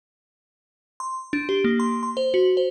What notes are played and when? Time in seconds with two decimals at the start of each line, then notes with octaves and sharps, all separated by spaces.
1.00 C6
1.33 D4
1.49 G4
1.64 A#3
1.80 C6
2.03 C6
2.17 C5
2.34 F#4
2.57 C5